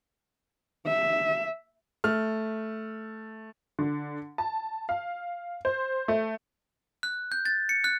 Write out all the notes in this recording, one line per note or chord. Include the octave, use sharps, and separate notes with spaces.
E5
A3 F6
D3
A5
F5
C5
A3
F#6
G6
A6
C#7
F#6